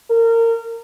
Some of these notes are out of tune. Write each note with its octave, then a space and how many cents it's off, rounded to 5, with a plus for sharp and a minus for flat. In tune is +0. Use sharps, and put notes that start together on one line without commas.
A#4 -25